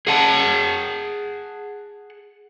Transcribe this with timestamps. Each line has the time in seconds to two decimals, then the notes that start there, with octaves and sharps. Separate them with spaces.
0.07 G#4 F#5 A5